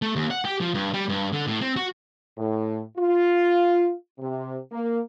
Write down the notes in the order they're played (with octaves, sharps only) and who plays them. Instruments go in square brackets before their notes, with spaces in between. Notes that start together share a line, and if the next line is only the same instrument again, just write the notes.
[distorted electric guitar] A3
D#2
F#5
G4
F3
G2
G3
G2
D3
A2
C4
F#4
[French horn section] A2
F4
C3
A#3